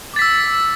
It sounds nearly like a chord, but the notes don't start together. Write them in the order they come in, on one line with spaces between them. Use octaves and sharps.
D6 A6 B6 E6